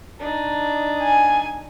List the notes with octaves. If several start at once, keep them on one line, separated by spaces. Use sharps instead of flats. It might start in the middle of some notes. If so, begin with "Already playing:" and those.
D4 D#4
G#5